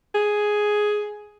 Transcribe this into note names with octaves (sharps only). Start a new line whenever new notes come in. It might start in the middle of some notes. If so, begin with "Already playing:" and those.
G#4